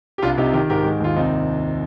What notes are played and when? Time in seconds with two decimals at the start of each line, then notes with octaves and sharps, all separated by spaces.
0.18 G4
0.22 C2 D4 F4
0.38 C3 D#4 G4
0.53 D#3 D#4 G4
0.69 G#2 G4 A#4
0.85 G#3
1.00 D#2 F4
1.17 C2 C4 D#4